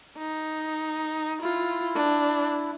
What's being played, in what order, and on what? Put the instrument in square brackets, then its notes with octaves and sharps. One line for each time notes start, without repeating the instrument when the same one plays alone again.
[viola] D#4
[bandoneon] E4 [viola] F4
[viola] D4